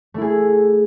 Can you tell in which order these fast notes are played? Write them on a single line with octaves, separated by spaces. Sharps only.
A3 E4 G#4